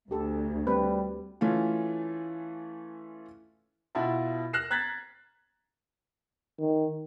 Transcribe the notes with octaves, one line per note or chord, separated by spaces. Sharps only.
D2 G4 A4
G3 C4 B4
E3 A3 C#4 F4
B2 E4 F4 F#5 A5
F6 F#6 A#6 C7 E7
A#5 F#6 G#6 A6 B6 F#7
D#3